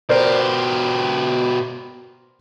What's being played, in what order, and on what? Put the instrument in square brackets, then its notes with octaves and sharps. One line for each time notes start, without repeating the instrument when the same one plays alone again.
[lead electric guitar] B2 G4 [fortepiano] A#4 C5 D5